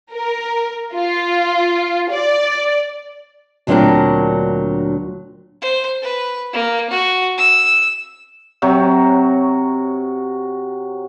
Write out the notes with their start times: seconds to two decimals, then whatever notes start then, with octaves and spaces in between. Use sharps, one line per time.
0.12 A#4
0.94 F4
2.11 D5
3.67 D2 A#2 F#3 C4 D4 A#4
5.62 C5
6.02 B4
6.53 A#3
6.90 F#4
7.38 E6
8.62 C3 F#3 C#5